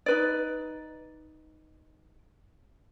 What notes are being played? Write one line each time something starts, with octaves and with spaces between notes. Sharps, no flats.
D#4 B4 D5